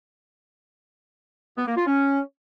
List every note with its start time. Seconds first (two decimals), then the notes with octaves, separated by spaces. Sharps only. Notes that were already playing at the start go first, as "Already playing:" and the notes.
1.57 B3
1.67 A#3
1.76 F4
1.86 C#4